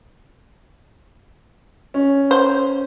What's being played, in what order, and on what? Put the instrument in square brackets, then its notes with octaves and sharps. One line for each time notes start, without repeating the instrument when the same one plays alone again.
[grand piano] C#4
[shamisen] C5